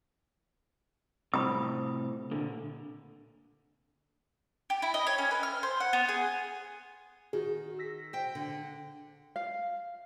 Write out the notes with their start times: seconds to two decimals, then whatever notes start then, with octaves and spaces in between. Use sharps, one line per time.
1.34 A2 C3 C4 B5 D#6
2.31 A#2 D3
4.70 G4
4.82 E4
4.94 D#5
5.07 C#5
5.18 C#4
5.31 B4
5.43 F6
5.63 C5
5.80 F#5
5.93 B3
6.09 G#4
7.33 D#3 F#4 G#4
7.79 E6 A#6 B6
8.13 C5 G5
8.35 D3
9.36 F5